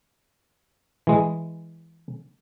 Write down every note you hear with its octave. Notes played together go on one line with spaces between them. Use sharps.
E3 G#3